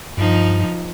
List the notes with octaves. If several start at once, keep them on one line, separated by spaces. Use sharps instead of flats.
G2 F3 D#4